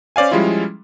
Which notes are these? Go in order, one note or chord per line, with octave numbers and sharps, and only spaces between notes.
C#4 C5 D5 F5 G#5
F3 G3 G#3 C#4 E4 F4